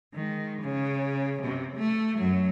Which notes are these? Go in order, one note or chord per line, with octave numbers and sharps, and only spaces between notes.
D#3 G#3
C#3
C3
A3
F#2 F#3